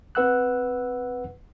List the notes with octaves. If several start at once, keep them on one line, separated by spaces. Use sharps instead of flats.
C4 B4 F#5 E6 F#6